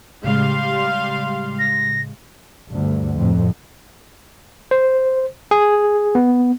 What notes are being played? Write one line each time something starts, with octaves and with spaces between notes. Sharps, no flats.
A2 C#3 G3 G#3 F5 C6
A#6
D2 G2
F2 A2
C5
G#4
B3